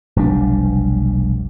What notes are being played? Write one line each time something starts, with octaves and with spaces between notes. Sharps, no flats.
F1 B1 G3 D4